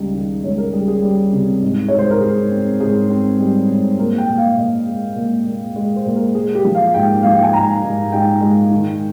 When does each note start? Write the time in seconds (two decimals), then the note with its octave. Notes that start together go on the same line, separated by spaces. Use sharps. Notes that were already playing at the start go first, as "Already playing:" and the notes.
Already playing: C#2 D#3 G3 D#5
0.14 D#3
0.44 C#2 C#5
0.58 A#4
0.73 G3 G#4
0.88 G#4
1.02 G3
1.32 C3
1.63 G#2
1.88 G#2 C#5
1.99 C5
2.11 A#4
2.21 G#2 G#4
2.51 C4
2.80 G#2 G#4
3.10 C4
3.39 G3
3.69 G#2
3.99 A#2 A#4
4.18 G5
4.28 A#2
4.38 F5
4.57 A#2 D#5
4.87 G#3
5.16 A#2
5.46 A#2
5.76 G#3
5.96 C5
6.06 A#2
6.16 A#4
6.35 G#3 G#4
6.55 G4
6.65 F3
6.75 F5
6.94 G#2 G5
7.23 F3 F5
7.33 G5
7.43 G#5
7.53 G#2 A#5
7.83 G#2
8.12 G#2 G5
8.41 G#3
8.71 D#3